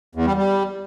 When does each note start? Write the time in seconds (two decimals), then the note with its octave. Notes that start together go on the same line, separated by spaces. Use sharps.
0.15 E2
0.26 G3
0.37 G3